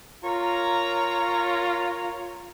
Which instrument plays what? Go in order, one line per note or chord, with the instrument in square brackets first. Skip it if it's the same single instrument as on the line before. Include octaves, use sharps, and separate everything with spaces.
[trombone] F4 [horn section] A#4 C#5 A#5